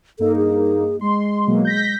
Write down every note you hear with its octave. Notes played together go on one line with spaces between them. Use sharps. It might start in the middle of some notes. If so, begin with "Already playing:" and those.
G2 A#3 D#4 A4
G#4
G#3 C6
B2 F#3 A#3
G6 A#6 B6